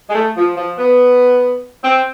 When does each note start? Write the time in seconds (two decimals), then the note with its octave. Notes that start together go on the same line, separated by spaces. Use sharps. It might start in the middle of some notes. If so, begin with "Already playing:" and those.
0.09 G#3
0.14 A3
0.36 F3
0.56 F3
0.78 B3
1.84 C4